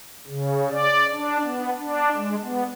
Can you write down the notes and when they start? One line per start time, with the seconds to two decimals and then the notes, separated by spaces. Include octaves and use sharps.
0.27 C#3
0.71 D5
1.14 D4
1.44 B3
1.79 D4
2.15 G#3
2.44 B3